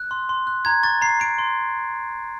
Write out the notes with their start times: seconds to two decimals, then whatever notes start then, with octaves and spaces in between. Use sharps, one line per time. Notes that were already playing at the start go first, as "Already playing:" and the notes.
Already playing: F#6
0.11 C6
0.29 C6
0.47 F#6
0.65 A#5 G#6
0.83 C#6 A6
1.02 A#5 C7
1.20 A#5 D7
1.39 C6